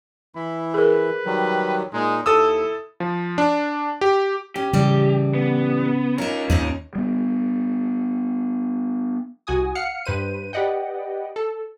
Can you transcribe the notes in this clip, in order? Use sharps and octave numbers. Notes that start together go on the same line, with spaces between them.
E3 E4 B5
G#4 A#4 B4
D#3 F#3 G3
A#2 G#3 D#4
D#2 E4 A4 D#6 E6
F3
D4
G4
C#4 G4
A2 C#3 E3 G3
B3
C#4 D#4 F4 A#4
D#2 G#2 C4 D#4
G3 B3
C2 F#4 G#5 D#6
F5 F#5 F6 C7 C#7
G2 B4 C5 D#7
G4 B4 D5 D#5 F#5 G5
A4